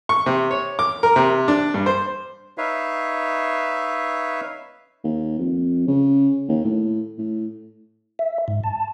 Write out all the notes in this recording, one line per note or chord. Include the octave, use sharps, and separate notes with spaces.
C#6
C3
C#5
D6
A#4
C3
D4
G2
C5
D#4 B4 C#5 E5 F5
D#2
F2
C#3
D#2
A2
A2
E5
G#2
A5